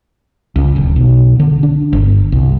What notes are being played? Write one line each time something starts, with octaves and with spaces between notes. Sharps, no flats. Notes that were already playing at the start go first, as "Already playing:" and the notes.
C#2
D1
B1
D3
D4
G1
C2